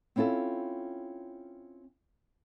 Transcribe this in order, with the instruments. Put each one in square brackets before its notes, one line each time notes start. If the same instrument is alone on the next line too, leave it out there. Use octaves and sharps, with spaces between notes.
[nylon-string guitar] C4 C#4 E4 F4 A4